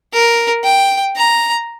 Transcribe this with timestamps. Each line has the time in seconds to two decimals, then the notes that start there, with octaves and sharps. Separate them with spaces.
0.13 A#4
0.64 G5
1.16 A#5